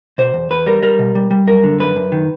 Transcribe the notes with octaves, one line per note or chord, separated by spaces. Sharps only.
B2 C5
E2
E2 B4
G3 A#4
G3 A#4
B2
G3
G3
F#2 A#4
D3
F#2 B4
F#2
D#3